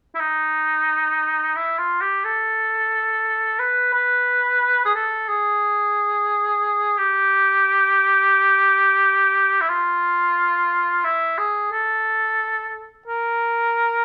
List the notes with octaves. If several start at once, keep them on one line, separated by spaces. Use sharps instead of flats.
E4
D#4
E4
F4
G4
A4
B4
B4
G#4
A4
G#4
G4
E4
F4
E4
G#4
A4
A#4